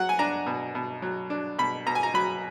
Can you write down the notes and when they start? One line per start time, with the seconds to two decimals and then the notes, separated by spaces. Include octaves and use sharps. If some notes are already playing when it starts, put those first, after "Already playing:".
Already playing: F#3 F#5
0.09 G#5
0.19 D4 A#5
0.46 B2
0.75 B2
1.02 F#3
1.30 D4
1.59 B2 B5
1.86 B2 A#5
1.95 G#5
2.03 A#5
2.14 F#3 B5